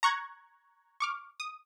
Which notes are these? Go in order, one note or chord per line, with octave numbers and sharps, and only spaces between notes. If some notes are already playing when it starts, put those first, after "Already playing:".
A#5 C#6 F#6 G#6
C#6 D6 F6
D#6